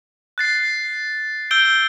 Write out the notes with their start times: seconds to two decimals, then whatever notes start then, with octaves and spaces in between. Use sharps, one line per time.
0.38 F#6 A6 C7
1.51 E6 G6 D7 G7